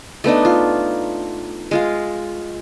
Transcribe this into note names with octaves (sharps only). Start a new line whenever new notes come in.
A3 B3 D4 D#4
F4
G#3 F4 F5